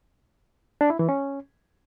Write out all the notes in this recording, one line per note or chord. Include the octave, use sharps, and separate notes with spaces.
D4
E4
E3
C#4